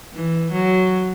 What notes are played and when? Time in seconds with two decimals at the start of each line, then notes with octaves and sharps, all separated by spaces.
0.13 E3
0.52 F#3